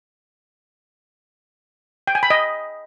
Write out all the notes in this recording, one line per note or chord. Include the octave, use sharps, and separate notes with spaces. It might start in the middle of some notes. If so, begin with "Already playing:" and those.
G5
G#5
B5
D#5